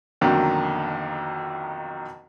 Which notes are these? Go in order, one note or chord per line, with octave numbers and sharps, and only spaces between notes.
B1 F2 D3 D#3 F#3 A#3